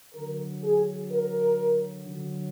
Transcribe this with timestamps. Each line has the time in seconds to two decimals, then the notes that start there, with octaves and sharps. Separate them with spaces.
0.14 D3 F#3 A#4
0.63 G#4
1.11 A#4
2.07 D3 F#3